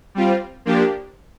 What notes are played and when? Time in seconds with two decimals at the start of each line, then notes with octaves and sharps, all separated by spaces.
0.15 G3 C4 F4
0.65 F3 A#3 D4 G4